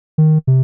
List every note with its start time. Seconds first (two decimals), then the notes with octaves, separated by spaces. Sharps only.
0.18 D#3
0.47 C3